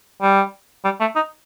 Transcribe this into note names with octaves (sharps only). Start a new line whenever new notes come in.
G3
G3
A3
D#4